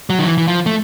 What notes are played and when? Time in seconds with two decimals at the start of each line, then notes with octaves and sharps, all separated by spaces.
0.10 F#3
0.19 D#3
0.26 E3
0.38 E3
0.47 F3
0.66 A3